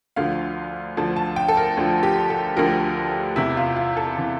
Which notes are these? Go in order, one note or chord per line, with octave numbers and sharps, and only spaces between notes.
D2 D3 F3 F5
D2 D3 F3 A5
A5
G5
A4
A#4
D2 D3 F3
G4
A4
D2 D3 F3 A#4
E2 C3 E3 E4
F4
F4
A4
C3 E3